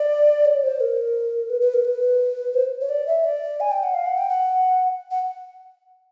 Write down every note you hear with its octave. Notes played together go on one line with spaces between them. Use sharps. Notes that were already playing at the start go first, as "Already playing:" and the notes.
Already playing: D5
C#5
C5
A#4
B4
B4
A#4
B4
C5
C#5
D5
E5
D5
G#5
G5
F#5
F5
F#5
G5
F#5
F#5